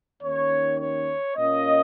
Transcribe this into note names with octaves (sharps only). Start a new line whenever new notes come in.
D#2 D#3 C#4 C#5
C#5
A#2 A#3 C#4 D#5